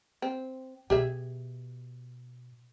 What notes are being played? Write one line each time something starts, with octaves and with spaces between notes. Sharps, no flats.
C4
B2 G4 G#4 E5